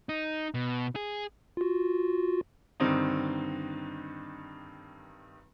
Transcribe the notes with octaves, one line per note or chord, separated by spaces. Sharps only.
D#4
B2
G#4
F4 F#4
G2 D3 D#3 C4 D#4